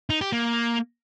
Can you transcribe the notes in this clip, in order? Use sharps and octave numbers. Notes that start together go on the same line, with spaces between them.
D#4
G4
A#3